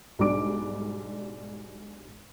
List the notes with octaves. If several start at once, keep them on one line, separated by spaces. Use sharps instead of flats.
B1 G#2 G3 D4 D6 D7